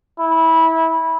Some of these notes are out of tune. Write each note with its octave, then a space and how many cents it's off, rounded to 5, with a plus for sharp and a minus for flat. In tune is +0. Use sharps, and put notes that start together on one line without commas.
E4 -20